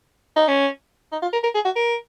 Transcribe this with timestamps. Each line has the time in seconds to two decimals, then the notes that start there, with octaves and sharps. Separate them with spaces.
0.36 D#4
0.48 C#4
1.12 D#4
1.22 F4
1.33 A#4
1.44 A#4
1.54 G#4
1.65 F#4
1.76 A#4